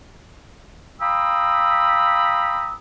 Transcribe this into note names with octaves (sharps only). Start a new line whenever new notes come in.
F5 G5 A#5 B5 D#6 E6